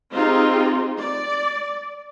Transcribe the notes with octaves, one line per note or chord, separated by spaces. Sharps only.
C4 D#4 F4 G4 G#4
D5